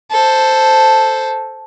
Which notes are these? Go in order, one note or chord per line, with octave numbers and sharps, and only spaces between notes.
A4 C5